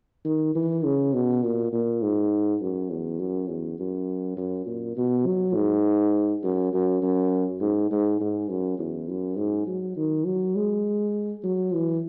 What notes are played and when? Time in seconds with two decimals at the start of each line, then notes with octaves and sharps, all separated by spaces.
0.25 D#3
0.55 E3
0.85 C#3
1.14 B2
1.43 A#2
1.72 A#2
2.02 G#2
2.61 F#2
2.90 E2
3.19 F#2
3.49 E2
3.79 F#2
4.37 F#2
4.66 A#2
4.97 B2
5.26 F#3
5.55 G#2
6.43 F#2
6.73 F#2
7.02 F#2
7.60 G#2
7.91 G#2
8.20 G#2
8.49 F#2
8.78 E2
9.08 F#2
9.37 G#2
9.67 F#3
9.97 D#3
10.26 F#3
10.55 G#3
11.44 F#3
11.74 E3